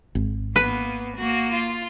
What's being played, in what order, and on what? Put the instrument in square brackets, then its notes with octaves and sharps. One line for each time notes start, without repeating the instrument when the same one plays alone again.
[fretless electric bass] G#1
[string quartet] A#3 B3 [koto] B4
[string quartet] A#3 F#4
F4